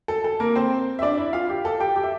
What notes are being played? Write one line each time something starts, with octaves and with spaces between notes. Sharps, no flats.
A4
A4
A#3 A#4
C4 C5
E5
D4 D5
E4 E5
F4 F5
G4
A4
G4 G5
G4 G5
E5